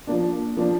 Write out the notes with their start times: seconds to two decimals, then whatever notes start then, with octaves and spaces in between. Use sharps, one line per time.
0.07 F3 A#3 D4
0.56 F3 A#3 D4